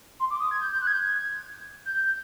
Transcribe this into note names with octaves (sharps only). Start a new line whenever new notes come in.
C6
D6
D#6
G#6
G6
G6
F#6
G#6
G6
G#6
G6